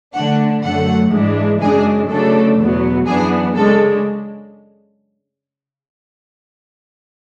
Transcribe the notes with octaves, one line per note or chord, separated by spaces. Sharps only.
D3 A3 D4 F#5
F#2 D3 A3 F#5
G#2 E3 G#3 D4
F#2 C#3 G#3 D4 G#4
C#3 F#3 A3 D4 A4
E2 B2 F#3 B3
F#2 E3 B3 D4 G#4
C#3 G#3 D4 A4